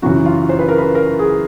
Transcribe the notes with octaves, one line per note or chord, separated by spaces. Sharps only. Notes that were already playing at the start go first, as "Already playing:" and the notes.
F#2 C#3 E3 F#4
F4
C5
B4
A#4
B4
A#4
G#4